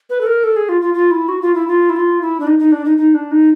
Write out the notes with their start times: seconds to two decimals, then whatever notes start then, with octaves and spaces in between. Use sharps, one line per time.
0.10 B4
0.21 A4
0.27 A#4
0.44 A4
0.56 G#4
0.69 F4
0.82 F4
0.94 F4
1.11 E4
1.28 F#4
1.42 F4
1.55 E4
1.68 F4
1.90 E4
1.96 F4
2.21 E4
2.40 D4
2.47 D#4
2.59 D#4
2.72 D4
2.85 D#4
2.97 D#4
3.14 D4
3.31 D#4